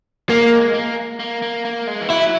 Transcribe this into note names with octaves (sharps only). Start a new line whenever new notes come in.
G#3 A#3
A#3
A#3
A#3
A#3
G#3
E3
F#3 E4